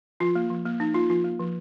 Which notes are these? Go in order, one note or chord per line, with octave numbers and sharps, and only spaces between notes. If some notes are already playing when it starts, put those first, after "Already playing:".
F3 F4
A#3
F3
A#3
F3 D#4
A#3 F4
F3 F4
A#3
F3